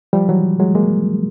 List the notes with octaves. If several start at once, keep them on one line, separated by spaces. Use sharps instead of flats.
F3 G3
E3 F#3
F#3 G#3
G#3 A#3